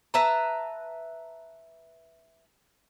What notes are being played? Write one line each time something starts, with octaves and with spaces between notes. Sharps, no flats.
B4 E5 A5 A#5